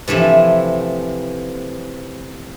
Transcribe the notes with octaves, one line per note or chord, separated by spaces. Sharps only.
C3 E3 F3 A3